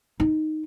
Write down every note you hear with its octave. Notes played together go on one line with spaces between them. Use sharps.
D#4